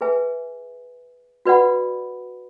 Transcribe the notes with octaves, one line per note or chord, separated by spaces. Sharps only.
G#4 B4 E5 G#5
F#4 B4 D5 F#5 B5